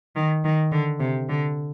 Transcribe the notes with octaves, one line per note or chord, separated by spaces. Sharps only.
D#3
D#3
D3
C3
D3